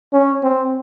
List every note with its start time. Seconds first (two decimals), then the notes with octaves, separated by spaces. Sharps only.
0.13 C#4
0.43 C4